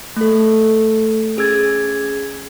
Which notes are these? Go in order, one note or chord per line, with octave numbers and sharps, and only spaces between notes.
A3 A4
C#4 G#4 E6 G#6 A6